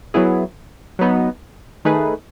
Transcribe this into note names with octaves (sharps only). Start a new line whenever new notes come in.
F#3 B3 E4 G#4
F#3 B3 D#4
D#3 A3 D#4 G#4 B4